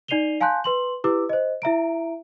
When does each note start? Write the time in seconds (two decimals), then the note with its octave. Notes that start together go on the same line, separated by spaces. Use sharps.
0.08 D#4 D5 C7 D#7 F7 G7
0.41 F5 G#5 A5 C6 F#6 G6
0.64 B4 C6 F#7
1.04 E4 G4 B4 D6 E6
1.29 C5 D#5
1.62 E4 E5 A#5 D7